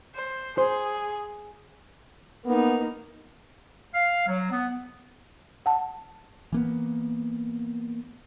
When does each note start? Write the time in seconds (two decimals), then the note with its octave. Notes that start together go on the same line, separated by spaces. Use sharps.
0.15 C5
0.58 G#4 C5
2.46 A#3 B3 D#4
3.94 F5
4.28 F#3
4.51 B3
5.66 F#5 A5
6.52 E3 A#3 B3